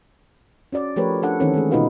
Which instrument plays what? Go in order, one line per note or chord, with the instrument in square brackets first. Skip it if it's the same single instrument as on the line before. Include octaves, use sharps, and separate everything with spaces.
[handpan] C#4 F#4 D5
F3 A3 G4 A#4 B4 C#5
D4 A4 F#5
D#3 E3 C4 C#4 A4
G#3 A3 G#4
B2 D#4 F4 F#4 B4 F5